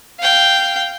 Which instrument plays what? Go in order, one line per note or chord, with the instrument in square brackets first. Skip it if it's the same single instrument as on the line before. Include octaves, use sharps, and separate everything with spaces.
[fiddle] F5 G5